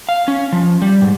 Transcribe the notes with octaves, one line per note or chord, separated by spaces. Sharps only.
F5
C#4
F3
G3
G#2